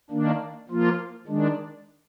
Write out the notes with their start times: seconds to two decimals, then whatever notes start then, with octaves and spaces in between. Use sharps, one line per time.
0.10 D#3 A#3 D4
0.69 F3 A#3 F4
1.27 D#3 G#3 D4